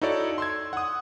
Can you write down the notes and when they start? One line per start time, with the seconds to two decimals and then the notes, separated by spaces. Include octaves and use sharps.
0.02 D#4 E4 F#4 A4 C#5 D5
0.38 C6 E6 G#6
0.73 F#5 D#6